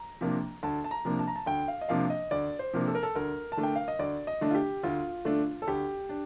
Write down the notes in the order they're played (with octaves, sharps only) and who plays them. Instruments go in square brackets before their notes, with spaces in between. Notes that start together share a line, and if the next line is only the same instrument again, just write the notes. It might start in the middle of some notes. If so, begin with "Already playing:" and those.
Already playing: [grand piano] A#5
C3 F3 A#3 D4
D2 A5
A5
A#5
C3 F3 A#3 D4
A5
A#5
A5
D2 G5
F5
D#5
C3 F3 A#3 D4 F5
D#5
D2 D5
C5
C3 F3 A#3 D4
A4
A#4
A4
D2 A#4
A5
D3 A3 D4
G5
F5
D#5
D2 D5
D#5
D3 A3 D4
F4
G4
D2 F4
D3 A3 D4
A4
D2 G4
D4